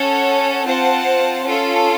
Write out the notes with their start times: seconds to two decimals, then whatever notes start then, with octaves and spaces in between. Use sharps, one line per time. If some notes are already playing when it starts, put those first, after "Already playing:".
Already playing: C#4 A4 C#5 F#5
0.66 C4 F4 C5 F#5 A5
1.44 C#4 F4 A4